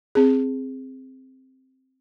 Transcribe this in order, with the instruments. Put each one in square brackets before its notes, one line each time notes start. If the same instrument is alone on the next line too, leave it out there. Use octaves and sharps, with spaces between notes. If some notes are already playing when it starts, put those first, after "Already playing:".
[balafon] C4 G#4